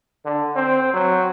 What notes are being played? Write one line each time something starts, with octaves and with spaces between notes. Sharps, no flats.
D3
C4
F#3